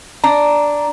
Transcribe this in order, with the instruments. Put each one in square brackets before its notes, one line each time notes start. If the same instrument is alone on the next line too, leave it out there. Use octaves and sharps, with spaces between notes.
[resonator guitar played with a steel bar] D4 [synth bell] A#5